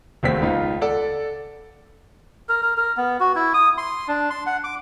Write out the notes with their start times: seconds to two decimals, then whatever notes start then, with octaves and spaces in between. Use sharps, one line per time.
0.23 E1 D#2 A3 C4 B6
0.42 C#2 D#4 F4
0.81 A4 D5 F#5
2.49 A#4
2.62 A#4
2.77 A#4
2.97 B3
3.20 F#4
3.35 E4
3.54 D#6
3.78 C6
4.08 D4
4.30 C6
4.46 F#5
4.64 D6